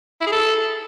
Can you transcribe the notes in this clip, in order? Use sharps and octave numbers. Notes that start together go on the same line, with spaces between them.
E4
G#4
A4